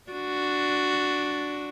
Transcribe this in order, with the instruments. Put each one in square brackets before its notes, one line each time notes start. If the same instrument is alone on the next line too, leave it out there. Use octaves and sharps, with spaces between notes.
[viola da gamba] D4 F#4